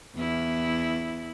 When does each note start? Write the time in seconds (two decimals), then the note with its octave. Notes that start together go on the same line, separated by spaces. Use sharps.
0.16 E2 E4